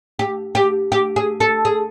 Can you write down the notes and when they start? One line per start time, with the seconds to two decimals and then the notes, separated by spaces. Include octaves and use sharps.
0.19 G4
0.55 G4
0.92 G4
1.16 G#4
1.40 A4
1.65 G#4